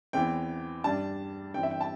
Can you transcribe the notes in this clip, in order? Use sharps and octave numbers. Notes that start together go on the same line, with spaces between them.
E2 E3 C4 G5
G2 G3 D4 A5
G2 E3 C4 G5
E5
G5
A5